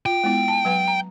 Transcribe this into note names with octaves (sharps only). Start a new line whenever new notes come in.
F4 G5
G#3 B3 E4
A5
F#3 B4 F#5
A#5